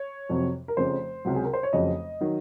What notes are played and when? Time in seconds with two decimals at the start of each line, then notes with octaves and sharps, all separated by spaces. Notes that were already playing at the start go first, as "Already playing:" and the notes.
Already playing: C#5
0.30 F2 C3 F#3
0.68 A#4
0.77 F1 F2 C#3 C5
1.25 C#2 C3 F#3
1.35 G#4
1.44 A#4
1.53 C5
1.63 C#5
1.73 F1 F2 C#3 F#3 D#5
2.21 D#3 F#3